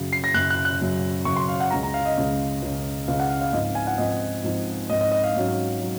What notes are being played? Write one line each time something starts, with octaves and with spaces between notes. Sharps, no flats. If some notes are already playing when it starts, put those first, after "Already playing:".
Already playing: F#2 C#3 F#3
C7
A#6
F#2 C#3 F#3 F#6
F#6
F#6
F#2 C#3 F#3
F#2 C#3 F#3 C#6
C6
F5
F#5
C#2 C#3 G#3 C#4 A#5
A#5
F5
D#5
C#2 C#3 G#3 C#4
C#2 C#3 G#3 C#4
C#2 C#3 G#3 C#4 F5
F#5
F5
F5
G#2 F3 C4 D#4 D#5
F5
G#5
F#5
G#2 F3 C4 D#4 D#5
G#2 F3 C4 D#4
G#2 F3 C4 D#4 D#5
D#5
D#5
F5
G#2 F#3 C#4
F#3